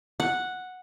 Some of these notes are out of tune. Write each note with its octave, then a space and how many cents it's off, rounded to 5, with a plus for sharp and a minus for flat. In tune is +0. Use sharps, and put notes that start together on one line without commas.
F#5 -5